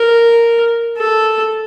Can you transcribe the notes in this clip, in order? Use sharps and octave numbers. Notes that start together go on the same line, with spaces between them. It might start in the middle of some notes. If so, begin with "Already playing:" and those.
Already playing: A#4
A4